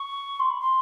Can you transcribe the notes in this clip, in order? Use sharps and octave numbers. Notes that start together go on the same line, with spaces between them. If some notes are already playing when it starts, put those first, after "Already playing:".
Already playing: C#6
C6
B5
C6